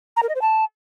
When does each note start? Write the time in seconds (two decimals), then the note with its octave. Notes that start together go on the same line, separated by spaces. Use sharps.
0.17 A#5
0.23 A#4
0.29 D#5
0.35 C5
0.42 A5